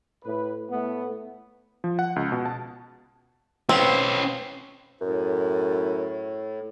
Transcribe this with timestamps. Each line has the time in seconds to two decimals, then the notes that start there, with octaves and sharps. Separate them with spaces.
0.24 A2 B4
0.70 A2 A3 B3
1.84 F3
1.99 F#5
2.16 C#2
2.32 B2
2.46 A5
3.69 C4 C#4 B4
5.01 F#2 A2